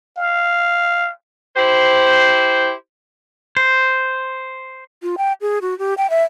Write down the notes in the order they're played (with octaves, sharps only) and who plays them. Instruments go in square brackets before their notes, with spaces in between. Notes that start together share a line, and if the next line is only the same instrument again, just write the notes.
[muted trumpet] F5
[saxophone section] E4 G4 C5
[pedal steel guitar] C5
[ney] F4
G5
G#4
F#4
G4
G5
E5